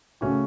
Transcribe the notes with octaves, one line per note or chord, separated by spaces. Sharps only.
C#3 A3 C#4 F#4